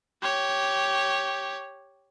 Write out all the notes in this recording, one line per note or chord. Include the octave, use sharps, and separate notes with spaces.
G4 C#5